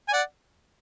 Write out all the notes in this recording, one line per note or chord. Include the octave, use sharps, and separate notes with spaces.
G#5
D5 F#5